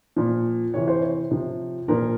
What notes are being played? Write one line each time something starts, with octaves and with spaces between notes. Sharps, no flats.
A#2 F3
C3 E3 C#5
C5
C#5
C3 F3
A#2 F3 A#4